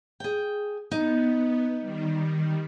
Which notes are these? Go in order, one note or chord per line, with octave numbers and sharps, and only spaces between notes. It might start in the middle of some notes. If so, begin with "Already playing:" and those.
G#4 G5
B3 D#4
D#3 G3